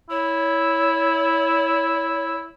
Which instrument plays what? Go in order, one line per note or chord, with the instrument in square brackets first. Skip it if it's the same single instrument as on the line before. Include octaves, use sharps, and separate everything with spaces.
[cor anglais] E4 [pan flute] C#5